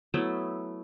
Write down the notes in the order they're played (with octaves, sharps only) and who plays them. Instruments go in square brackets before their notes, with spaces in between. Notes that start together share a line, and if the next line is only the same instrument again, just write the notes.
[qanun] F#3 A3 B3 E4